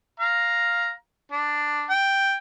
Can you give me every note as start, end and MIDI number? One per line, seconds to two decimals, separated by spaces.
0.20 0.92 77
0.20 0.92 82
1.32 1.88 62
1.90 2.35 79